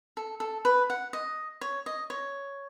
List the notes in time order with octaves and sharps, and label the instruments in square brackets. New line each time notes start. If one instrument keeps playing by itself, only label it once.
[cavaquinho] A4
A4
B4
F#5
D#5
C#5
D#5
C#5